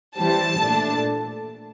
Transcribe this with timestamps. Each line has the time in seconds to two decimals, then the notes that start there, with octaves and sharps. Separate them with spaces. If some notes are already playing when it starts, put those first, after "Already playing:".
0.17 E3 G3 C4 A5
0.60 A#2 A3 D4